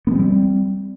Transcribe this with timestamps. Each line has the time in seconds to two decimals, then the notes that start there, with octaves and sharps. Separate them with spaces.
0.07 B3
0.11 G#3
0.15 C4
0.19 G3